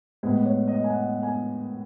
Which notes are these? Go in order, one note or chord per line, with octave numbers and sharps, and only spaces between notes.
A2 G#3 B3 B4
C#5
D#5
G#5
F#5
G#5